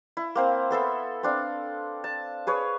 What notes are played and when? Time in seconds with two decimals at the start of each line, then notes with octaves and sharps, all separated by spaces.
0.17 E4
0.35 A#3 C4 C5
0.71 B3 A4 E5 C6
1.23 C4 D4 F5
2.04 A5
2.47 G#4 B4 C#5